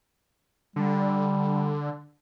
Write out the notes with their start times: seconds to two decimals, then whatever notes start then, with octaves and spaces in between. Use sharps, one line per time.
0.76 D3 G3